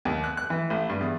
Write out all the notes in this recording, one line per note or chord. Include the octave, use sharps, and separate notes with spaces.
D#2
F#6
F#6
E3
A1
G2
E2